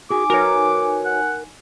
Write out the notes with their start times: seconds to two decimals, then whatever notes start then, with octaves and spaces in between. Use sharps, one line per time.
0.10 D#4 F#4 G#4 G#5 D6
0.30 F#4 A#4 B4 C#5
1.05 F#5